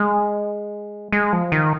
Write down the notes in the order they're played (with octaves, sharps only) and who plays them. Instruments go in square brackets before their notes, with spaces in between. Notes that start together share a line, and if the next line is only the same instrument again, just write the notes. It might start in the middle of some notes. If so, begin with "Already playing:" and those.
Already playing: [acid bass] G#3
G#3
F3
D#3